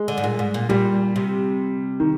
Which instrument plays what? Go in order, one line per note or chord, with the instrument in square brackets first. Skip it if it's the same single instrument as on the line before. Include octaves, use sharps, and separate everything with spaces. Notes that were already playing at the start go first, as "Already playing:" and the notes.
Already playing: [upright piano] G#3
[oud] D3
G#2
A#2
G#2
A#2
[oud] A#2 [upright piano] G3
[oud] C3
[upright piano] D#3